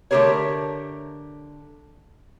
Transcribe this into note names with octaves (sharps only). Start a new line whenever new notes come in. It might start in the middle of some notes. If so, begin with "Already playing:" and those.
D3 A3 G4 G#4 A#4 C#5